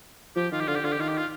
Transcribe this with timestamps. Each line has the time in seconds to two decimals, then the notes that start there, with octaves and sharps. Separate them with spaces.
0.36 F3 G4
0.52 D#3 F4
0.60 G4
0.67 D3 F4
0.76 G4
0.84 D3 F4
0.93 G4
0.99 D#3 F4
1.09 G4
1.18 F4